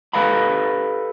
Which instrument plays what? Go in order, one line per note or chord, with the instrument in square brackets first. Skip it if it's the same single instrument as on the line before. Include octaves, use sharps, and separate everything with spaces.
[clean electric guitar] G4 A4 B4 D#5 F5 B5